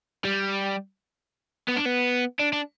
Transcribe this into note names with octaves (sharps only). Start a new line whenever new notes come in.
G3
B3
D4
B3
D4
D4